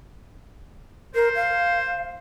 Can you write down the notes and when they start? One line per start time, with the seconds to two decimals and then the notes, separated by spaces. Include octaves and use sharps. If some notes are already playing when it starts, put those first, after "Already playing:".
1.15 A#4 C5
1.35 F5